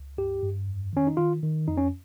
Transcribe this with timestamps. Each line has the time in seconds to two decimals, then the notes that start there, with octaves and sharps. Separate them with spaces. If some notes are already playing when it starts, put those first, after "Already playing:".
Already playing: C#2
0.17 G2 G4
0.43 G2
0.67 F2
0.93 D#3 C#4
1.07 D#4
1.17 D#3 F4
1.43 D#3
1.68 F2 D#4
1.77 C#4